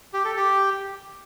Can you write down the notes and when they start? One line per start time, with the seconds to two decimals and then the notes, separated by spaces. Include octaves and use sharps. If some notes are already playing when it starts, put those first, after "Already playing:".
0.14 G4
0.25 A4
0.36 G4